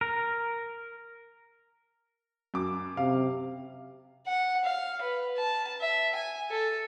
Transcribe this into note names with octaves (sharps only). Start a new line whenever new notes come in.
A#4
F#2 D6
C3 F5
F#5
F5
B4
A5
E5
G#5
A4